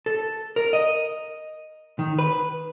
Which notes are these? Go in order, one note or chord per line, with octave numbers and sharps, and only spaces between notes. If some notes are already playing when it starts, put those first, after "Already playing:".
A4
A#4
D#5
D#3
B4